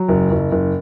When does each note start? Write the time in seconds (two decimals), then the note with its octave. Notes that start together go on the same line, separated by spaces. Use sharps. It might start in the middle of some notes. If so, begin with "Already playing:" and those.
Already playing: F#3
0.08 F#1
0.31 F#1
0.52 F#1